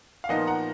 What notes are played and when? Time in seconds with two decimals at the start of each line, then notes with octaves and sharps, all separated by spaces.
0.24 F5
0.29 A#2 F3 B3 D#4 D#5 F#5
0.47 F#5 A#5